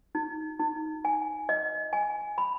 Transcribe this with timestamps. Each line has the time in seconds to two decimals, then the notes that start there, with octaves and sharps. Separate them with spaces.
0.15 D#4
0.60 D#4
1.05 G#5
1.49 D#5
1.93 G#5
2.38 B5